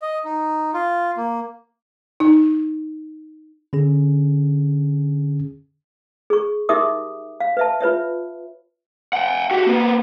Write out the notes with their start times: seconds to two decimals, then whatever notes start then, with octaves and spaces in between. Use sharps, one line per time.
0.02 D#5
0.25 D#4
0.74 F4
1.17 A#3
2.20 D#4
3.73 D3 C#4 G#4
6.30 G#4 C#6
6.69 D#4 G4 A#4 E5 D6 D#6
7.40 F5
7.57 B4 E5 A5
7.81 F4 B4 C#5 E5
9.13 F#5 G5
9.51 F#4 G4
9.67 A#3 B3